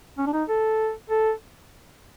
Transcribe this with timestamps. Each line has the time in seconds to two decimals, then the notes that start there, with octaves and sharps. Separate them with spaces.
0.18 C#4
0.27 D4
0.33 D#4
0.49 A4
1.10 A4